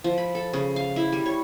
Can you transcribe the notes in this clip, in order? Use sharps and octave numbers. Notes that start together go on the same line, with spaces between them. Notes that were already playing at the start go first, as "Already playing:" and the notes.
F3
B5
A4
C#3
F5
E4
G3
C#5